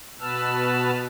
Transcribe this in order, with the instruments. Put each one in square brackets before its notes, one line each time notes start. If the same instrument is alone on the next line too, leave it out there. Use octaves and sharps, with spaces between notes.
[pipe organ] B2 B3 B4 A5 E6 F6